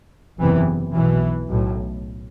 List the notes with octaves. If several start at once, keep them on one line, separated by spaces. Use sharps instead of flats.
F#1 E2 C3 E3
B1 B2 E3
B1 A2